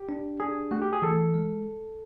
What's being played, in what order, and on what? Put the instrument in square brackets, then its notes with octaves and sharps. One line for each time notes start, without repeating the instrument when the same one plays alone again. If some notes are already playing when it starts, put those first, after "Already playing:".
Already playing: [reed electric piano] G4
[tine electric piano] D4
[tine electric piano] D4 [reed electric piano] G#4
[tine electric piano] A3 [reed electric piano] F#4
[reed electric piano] G4
G#4
[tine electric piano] E3 [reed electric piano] A4
[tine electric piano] G#3